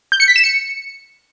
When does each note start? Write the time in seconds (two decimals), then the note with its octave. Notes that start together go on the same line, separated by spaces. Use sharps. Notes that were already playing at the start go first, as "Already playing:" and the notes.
0.12 G6
0.20 C#7
0.28 B6
0.36 E7
0.44 C#7